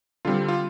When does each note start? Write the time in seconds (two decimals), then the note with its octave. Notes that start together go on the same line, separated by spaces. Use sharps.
0.25 D3 G3 C4 F4
0.48 F4